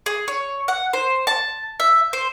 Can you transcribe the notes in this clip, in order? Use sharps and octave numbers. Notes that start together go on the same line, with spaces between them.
G#4
C#5
F#5
C5
A5
E5
C5